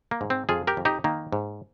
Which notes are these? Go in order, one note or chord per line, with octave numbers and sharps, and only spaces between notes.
A#3
G#2
C4
F2 F4 G#4
G4 A#4
F2
D#4 G4
D#3 A#3
G#2